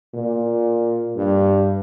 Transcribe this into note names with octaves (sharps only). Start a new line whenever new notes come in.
A#2
G2